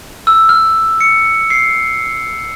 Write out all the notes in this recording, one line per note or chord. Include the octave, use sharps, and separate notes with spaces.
E6
F6
C#7
C7